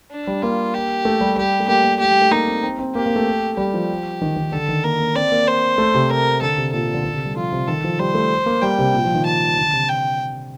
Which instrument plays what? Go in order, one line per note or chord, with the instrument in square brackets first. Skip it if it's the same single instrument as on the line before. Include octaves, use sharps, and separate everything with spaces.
[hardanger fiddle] D4
[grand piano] G3
[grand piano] A#3 [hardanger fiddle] F4
[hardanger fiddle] G4
[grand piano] A3
G3
[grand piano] G3 [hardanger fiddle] G4
[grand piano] A3
[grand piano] A#3 [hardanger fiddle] G4
[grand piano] A#3
[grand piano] A3 [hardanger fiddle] G4
[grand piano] G3
A3
[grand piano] A#3 [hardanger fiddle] D#4
[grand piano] C4
C4
C4
[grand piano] A#3 [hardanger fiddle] G4
[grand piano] A#3
A3
[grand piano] G3 [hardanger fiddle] G4
[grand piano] F3
D#3
D#3
[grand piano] D3 [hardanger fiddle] A4
[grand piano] D#3
[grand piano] A#3 [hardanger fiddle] A#4
[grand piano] A#3
[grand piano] C4 [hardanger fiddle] D5
[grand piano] A#3
[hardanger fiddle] C5
[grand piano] A3
C3
[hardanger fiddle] A#4
[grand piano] D3 [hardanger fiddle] A4
[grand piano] C3
[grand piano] A#2 [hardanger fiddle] A4
[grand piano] D3
D3
C3
G3
[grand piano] F3 [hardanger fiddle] F4
[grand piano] C3
[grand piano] D#3 [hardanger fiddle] A4
[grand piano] F3
[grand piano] G3 [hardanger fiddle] C5
[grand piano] A3
A#3
[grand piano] G3 [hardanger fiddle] G5
[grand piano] C3
A#2
F3
D#3
[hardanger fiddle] A5
[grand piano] D3
C3
[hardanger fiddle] G5